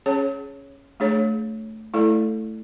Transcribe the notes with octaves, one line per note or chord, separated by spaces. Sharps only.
C#4 G#4 C#5
A3 D4 G#4 C#5
A3 E4 A4 D5